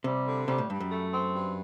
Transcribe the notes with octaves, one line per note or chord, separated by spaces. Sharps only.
C3 G3
D3
C3 G3
A2
G2 G3
F#2
A3
C4
G2